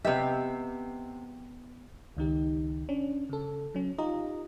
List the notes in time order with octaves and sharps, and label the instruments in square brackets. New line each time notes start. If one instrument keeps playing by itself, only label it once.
[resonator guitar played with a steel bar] C3 E5 [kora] B3 G4 [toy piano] D#5
[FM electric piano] C#2 D#3 D#4 G4
C#4 D4
C#3 A4
F#3 C#4
D#4 F4 G4 D#5 A#5